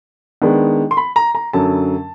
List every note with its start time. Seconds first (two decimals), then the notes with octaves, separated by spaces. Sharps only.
0.42 D#3 G#3 B3 D4
0.91 C6
0.97 B5
1.16 A#5
1.35 A#5
1.53 F#2 D3 F#3 A5